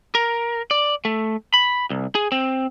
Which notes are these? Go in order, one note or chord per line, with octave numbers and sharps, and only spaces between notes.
A#4
D5
A3
B5
C2
G#4
C4